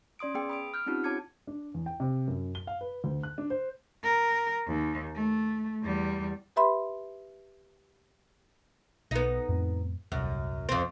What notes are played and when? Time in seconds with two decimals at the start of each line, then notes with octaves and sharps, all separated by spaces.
0.19 C#4 D5 C6 D#6 D7
0.34 B3 G#4 G5
0.49 B5 D#6 D7
0.74 F6 G6
0.86 C4 C#4 D#4 F4 G4
1.04 F4 C#5 A5 D6 G#6 C#7
1.47 D4
1.74 E2
1.86 G5
2.00 C3
2.27 F#2
2.55 G7
2.67 F5
2.81 B4
3.04 D2
3.23 F#6
3.38 D4
3.50 C5
4.03 A#4
4.67 D#2
5.15 A3
5.83 E2 G3
6.56 G4 B4 E5 B5 C6
9.11 B1 B3 D#4
9.49 F2 A2 C4
10.12 D#1 C2 F#2
10.69 F2 C4